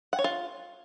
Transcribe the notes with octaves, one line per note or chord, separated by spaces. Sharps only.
F#5
C#5
F4